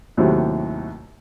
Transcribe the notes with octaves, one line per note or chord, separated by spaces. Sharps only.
D#2 A2 C3 F#3